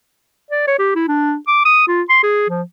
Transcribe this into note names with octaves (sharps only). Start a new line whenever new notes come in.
D5
C#5
G4
E4
D4
D6
D#6
F4
C6
G#4
F3